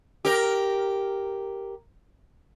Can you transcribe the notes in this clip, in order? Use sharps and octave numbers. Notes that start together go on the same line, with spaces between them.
G4 A#4